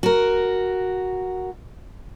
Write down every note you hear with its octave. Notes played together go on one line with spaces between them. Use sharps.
F#4 A#4